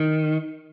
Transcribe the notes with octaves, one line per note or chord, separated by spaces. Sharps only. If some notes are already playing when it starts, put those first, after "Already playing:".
Already playing: D#3